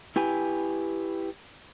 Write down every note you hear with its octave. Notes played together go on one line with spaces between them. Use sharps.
E4 G4 B4 G#5